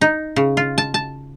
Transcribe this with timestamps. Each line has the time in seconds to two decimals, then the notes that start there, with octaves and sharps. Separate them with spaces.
0.01 D#4
0.36 C#3
0.57 F4
0.78 A5
0.94 A5